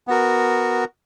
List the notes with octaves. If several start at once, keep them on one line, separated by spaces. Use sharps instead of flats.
B3 F#4 A#4